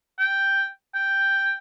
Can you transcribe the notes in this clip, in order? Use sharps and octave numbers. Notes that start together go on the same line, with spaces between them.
G5
G5